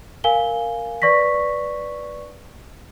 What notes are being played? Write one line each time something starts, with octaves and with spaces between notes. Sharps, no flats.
A#4 F5 G#5 G7
B4 D5 C#6 A#6 B6